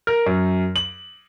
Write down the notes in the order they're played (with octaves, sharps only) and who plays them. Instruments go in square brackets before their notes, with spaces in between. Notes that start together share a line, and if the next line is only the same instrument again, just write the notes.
[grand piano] A#4
F#2
F#7